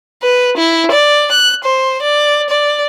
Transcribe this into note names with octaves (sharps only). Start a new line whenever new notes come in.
B4
E4
D5
F#6
C5
D5
D5